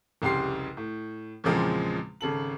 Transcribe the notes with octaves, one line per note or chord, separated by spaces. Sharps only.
F1 C2 C#3 G4 C6 C7
A2
E2 A#2 C#3 F3 G#3 C4
G#1 C#3 A4 F#7